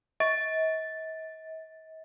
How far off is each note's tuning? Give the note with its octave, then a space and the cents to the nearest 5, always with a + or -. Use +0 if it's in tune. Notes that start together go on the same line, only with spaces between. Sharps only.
D#5 +45